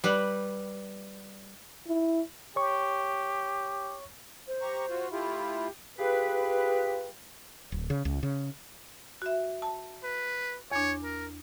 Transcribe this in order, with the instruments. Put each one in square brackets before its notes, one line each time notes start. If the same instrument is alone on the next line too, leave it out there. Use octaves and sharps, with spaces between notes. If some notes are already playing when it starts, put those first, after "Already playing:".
[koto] G3 B4
[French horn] E4
[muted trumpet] G4 [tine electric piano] C#5 C#6
[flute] C5
[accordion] G4 A#5 C#6
F4 F#4
[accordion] A3 E4 F4 [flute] G4
[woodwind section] F4 G4 G#4 B4
[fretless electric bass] D1
C#3
C#2
C#3
[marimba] F#4 E5
A5
[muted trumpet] B4
[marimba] E2 D4 [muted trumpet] C#5
[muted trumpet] A#4